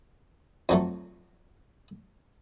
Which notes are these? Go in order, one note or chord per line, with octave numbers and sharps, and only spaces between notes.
F2 F#3 A3